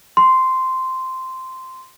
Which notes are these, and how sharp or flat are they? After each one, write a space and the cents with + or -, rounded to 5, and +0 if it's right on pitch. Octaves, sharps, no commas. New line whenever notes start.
C6 -10